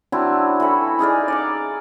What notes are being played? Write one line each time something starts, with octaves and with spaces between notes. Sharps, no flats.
F#3 C4 D4 E4
E3 A4 B5 C#6
D#4 G#4 A#4 D5
D5 F#5 D6